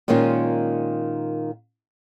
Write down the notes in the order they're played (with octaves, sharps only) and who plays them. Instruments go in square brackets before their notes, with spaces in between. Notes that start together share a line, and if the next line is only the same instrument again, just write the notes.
[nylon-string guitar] A#2 D#3 G#3 A#3 C#4 F4